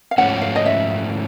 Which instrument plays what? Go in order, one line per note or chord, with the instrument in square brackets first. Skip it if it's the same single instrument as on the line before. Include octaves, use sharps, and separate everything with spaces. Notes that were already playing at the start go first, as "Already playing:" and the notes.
[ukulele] F5
[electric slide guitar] G#2 F3 A3 C#4 [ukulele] F#5
[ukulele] F5
D#5
E5